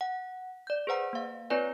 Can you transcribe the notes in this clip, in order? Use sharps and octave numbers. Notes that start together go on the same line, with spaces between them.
F#5
D5 G6
G#4 B4 C5 F#5 A#5
A#3 F5
C4 F4 B4 C#5 D5 G#5